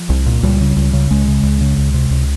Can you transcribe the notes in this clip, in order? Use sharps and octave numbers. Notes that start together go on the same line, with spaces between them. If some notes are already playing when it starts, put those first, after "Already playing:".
Already playing: F3
C2
A#2
C#2 G3
C#3
C#2
C#3
C#2 G#3
C#3
C#2
C#3
C#2
C3
C#2